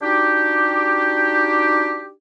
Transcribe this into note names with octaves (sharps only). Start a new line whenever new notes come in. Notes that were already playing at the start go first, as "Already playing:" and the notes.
D4 D#4 F#4 G4